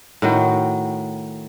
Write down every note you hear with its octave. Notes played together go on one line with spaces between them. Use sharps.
A2 D#3 F#4